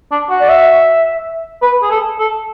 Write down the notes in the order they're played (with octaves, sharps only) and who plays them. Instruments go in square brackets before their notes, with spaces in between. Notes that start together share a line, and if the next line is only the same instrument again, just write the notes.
[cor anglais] D4
F#4
[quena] D5
E5
[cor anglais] B4
G#4
A4
A4